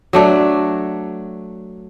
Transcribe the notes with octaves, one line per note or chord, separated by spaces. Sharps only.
F#3 A3 D4